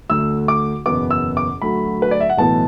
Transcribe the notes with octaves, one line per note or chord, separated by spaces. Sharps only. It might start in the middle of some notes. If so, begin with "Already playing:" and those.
D2 D3 A3 E6
D6
F#1 E2 B2 B3 D6
E6
D6
D2 D3 F#3 A3 B5
B4
D5
E5
F#5
B1 A2 E3 B3 A5